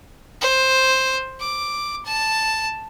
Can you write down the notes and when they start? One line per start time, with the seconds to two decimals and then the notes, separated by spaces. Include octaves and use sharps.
0.41 C5
1.41 D6
2.05 A5